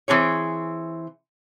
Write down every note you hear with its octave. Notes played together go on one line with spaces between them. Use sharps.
E3 C4 G#4 C#5